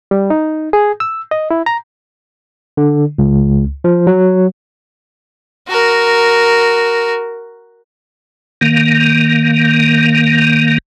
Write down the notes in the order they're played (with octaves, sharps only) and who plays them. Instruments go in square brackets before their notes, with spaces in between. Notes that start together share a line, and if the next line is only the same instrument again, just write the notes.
[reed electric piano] G3
D#4
G#4
E6
D#5
E4
A#5
[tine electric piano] D3
C#2
F3
F#3
[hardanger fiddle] F#4 A#4
[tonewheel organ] D#3 A#3